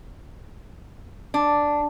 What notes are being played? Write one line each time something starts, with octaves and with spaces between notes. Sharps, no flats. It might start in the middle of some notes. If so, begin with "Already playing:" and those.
D4